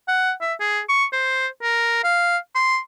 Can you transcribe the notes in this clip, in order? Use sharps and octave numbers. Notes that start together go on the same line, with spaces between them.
F#5
E5
G#4
C#6
C5
A#4
F5
C6